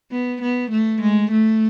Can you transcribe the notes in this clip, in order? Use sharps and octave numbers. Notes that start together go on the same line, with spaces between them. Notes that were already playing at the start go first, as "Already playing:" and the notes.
B3
B3
A3
G#3
A3